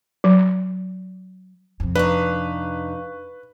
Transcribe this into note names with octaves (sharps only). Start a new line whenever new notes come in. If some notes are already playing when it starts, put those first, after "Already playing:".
F#3
F2 C3
D4 D#4 B4 F5 C#6